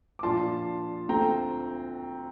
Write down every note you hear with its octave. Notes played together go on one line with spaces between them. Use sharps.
D6
A#2 F3 A#3 D4 F4 A5 C6
D2 D3 A3 C4 F4 G5 A#5